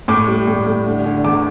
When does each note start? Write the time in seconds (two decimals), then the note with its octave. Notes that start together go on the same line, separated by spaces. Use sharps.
0.08 A2 D6
0.28 G3
0.47 A2
0.66 A2
0.86 D3
1.05 D3
1.24 E2 D6